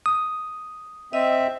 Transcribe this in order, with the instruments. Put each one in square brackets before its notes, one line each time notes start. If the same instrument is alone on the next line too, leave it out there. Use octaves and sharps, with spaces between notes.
[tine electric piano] D#6
[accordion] C4 E5 [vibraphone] D#5